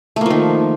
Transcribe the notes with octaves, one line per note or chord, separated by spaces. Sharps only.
D#3 F3 A3 A#3